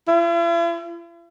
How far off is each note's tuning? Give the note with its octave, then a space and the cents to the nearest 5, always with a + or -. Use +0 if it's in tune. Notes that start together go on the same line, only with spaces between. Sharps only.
E4 +45